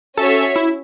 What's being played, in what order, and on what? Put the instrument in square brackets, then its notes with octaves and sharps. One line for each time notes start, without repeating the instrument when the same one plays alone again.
[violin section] C#4 F#4 C#5 E5 [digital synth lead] A4
[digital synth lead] E4